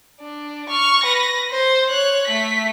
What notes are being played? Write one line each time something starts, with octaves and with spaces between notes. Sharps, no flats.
D4
C#6 F6
B4 A#6
C5
C#5 F#6
A3 B6